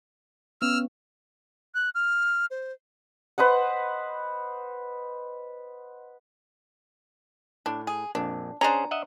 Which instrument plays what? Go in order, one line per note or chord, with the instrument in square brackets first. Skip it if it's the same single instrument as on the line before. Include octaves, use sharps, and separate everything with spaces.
[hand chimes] B3 C#4 [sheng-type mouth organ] E6 F6
[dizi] F#6
F6
C5
[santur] B4 C5 D#5 F#5
[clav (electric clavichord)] A2 [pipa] D4
[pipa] G#4
[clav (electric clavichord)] A#1 F2 [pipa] D4
[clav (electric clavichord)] C#4 G#4 C5 [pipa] D4 A#5
[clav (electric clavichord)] D#5 E5 F#5